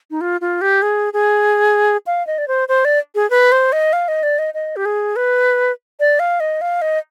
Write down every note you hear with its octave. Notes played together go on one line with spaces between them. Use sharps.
D#4
F4
F4
G4
G#4
G#4
F5
D#5
D5
C5
C5
D5
G#4
B4
C5
D#5
F5
D#5
D5
D#5
D#5
G4
G#4
B4
D5
F5
D#5
F5
D#5